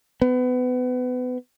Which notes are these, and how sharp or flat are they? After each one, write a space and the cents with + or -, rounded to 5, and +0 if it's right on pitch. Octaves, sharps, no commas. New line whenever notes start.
B3 +25